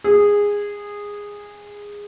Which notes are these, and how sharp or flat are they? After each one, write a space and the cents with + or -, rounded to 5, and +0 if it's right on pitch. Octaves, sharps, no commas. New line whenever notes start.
G#4 -15